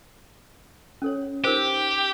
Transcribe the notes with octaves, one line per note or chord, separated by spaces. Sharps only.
C#4 A4 C#5
D#4 G4 A#4 C5